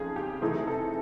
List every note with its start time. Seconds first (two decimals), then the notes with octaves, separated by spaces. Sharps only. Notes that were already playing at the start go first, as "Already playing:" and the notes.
Already playing: F2 C#3 F3 D#4 G#4
0.16 G4
0.42 C3 E3 A3 C4 D#4 G#4
0.67 A4